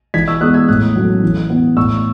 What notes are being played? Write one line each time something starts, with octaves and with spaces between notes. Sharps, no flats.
E3 G#6 B6
C#6 E6
G#3 B3 D#6 F#6
E6 G#6
A2 D#6 F#6
F#3 A3 C#4
E3
B3
A2 C#6 E6